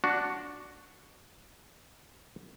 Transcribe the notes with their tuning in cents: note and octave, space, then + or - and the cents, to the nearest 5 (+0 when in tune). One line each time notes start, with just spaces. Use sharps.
D4 +0 F#4 +0